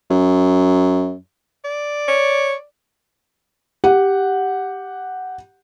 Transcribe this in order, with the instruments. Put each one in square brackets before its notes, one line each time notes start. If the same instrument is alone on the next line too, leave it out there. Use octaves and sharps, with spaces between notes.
[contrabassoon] F#2
[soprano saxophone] D5
[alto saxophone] C#5
[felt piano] G4 F#5